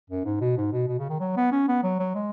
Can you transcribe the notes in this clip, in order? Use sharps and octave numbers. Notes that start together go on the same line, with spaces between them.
F#2
G#2
B2
G#2
B2
B2
C#3
D#3
F#3
B3
C#4
B3
F#3
F#3
G#3